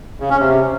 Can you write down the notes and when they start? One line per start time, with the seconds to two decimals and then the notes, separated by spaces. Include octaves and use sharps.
0.20 C#3
0.30 C#4
0.40 C3